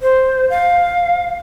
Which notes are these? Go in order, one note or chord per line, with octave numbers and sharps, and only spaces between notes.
C5
F5